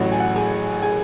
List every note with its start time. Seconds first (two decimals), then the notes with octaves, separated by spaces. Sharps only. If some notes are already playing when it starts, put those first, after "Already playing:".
Already playing: A1 A2 F#3 F#5
0.12 G#5
0.20 F#5
0.36 G#4 G#5
0.82 G#4 G#5